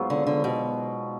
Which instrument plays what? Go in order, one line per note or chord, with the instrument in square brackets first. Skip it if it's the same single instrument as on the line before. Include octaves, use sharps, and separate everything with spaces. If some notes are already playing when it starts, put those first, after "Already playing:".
Already playing: [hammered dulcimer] G#2 F#3 B3 F4
[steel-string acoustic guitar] D3
D3
B2